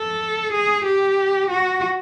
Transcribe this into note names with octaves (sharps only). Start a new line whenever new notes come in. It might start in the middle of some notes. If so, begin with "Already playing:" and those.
Already playing: A4
G#4
G4
F#4